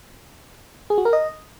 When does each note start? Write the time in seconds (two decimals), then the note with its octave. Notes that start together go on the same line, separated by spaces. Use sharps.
0.90 G#4
0.98 F#4
1.05 A#4
1.13 D#5